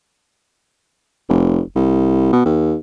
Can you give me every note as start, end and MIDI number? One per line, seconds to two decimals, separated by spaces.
1.29 1.61 29
1.76 2.32 36
2.33 2.41 47
2.45 2.76 39